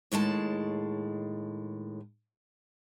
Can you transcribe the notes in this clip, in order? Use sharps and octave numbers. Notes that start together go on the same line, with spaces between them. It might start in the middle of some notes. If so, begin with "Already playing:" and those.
D#2 A2 G#3 A5